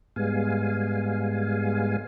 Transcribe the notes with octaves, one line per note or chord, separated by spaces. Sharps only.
G#2 G3 G#3 B3 F5 G#5